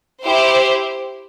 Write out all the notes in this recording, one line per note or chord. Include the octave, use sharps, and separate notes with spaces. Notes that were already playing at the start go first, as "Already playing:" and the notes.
E4 G4 C5